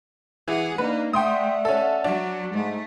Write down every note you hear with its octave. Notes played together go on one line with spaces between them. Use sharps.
E3 G#4 F#5
A#3 D4 D#4 B4
A3 D5 E5 F#5 G5 C6 D#6
C#4 A4
F#3 D4
G#2 A3